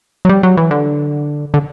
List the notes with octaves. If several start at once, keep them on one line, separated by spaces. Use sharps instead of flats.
F#3
G3
F#3
E3
D3
D3